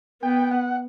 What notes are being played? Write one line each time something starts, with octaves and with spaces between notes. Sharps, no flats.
B3 G5
F#5